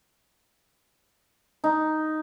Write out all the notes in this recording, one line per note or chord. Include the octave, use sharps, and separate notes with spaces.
D#4